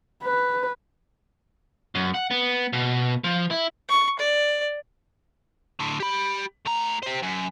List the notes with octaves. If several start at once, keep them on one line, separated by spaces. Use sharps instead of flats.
B4
F#2
F#5
B3
B2
F3
E4
C#6
D5
A2 D3
G4 B5
A2 A#5
G4 C5
F#2